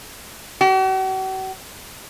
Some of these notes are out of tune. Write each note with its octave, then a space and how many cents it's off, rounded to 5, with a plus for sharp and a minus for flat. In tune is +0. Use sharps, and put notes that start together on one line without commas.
F#4 +45